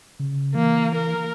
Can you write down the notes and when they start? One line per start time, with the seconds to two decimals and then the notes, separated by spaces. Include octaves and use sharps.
0.20 C#3
0.55 E3 A#3
0.96 A#4